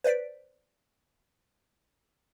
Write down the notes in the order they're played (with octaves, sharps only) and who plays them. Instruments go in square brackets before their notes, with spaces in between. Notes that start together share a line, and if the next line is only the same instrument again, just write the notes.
[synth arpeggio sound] B4 C5 D5 B6 D7